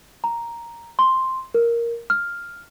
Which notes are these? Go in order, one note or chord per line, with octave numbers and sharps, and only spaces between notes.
A#5
C6
A#4
F6